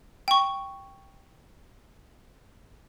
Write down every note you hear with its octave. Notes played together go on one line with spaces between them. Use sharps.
G5 C#6